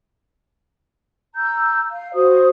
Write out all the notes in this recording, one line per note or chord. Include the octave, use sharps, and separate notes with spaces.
A#5 E6 G6
F5
F#4 C5 D#6